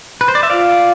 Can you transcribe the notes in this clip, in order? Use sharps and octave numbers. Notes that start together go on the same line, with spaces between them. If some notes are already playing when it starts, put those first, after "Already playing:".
B4
C5
D5
E5
F4 D5 F5